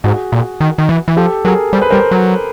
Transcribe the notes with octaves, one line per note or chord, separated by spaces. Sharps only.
G#2 F#4 G#4
A#2
D#3
D#3
E3
E3
F3 G4 A4
F#3 G#4 A#4
G3 C5
B4
G3 A#4 C5
F#3